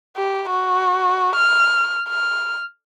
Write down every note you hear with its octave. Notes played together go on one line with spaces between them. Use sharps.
G4
F#4
F6
F6